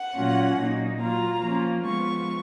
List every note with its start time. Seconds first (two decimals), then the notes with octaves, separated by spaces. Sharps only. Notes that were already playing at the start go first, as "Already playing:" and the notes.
Already playing: F#5
0.16 A#2 F#3 A#3 C#4 F4
0.58 A#2 F#3 A#3 D#4
1.00 F#3 A#3 F4 A#5
1.43 F3 A#3 C#4 F4
1.85 F3 G#3 B3 F4 C#6